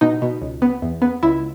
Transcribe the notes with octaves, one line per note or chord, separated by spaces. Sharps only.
B2 D#4
B2
C#2
B3
E2
B3
C#2 E4